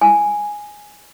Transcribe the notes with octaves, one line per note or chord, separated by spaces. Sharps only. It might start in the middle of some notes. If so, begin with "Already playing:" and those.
G#5